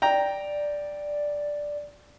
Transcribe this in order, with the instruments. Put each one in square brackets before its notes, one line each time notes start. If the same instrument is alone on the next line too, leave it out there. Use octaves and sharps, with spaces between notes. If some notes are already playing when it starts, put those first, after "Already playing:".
[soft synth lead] D5 [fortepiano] G5 A#5